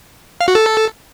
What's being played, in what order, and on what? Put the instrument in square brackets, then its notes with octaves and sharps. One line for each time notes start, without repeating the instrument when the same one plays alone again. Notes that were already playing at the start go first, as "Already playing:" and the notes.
[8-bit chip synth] F5
F#4
A4